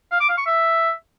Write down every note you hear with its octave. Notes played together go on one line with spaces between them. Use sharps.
F5
D6
F5
C#6
E5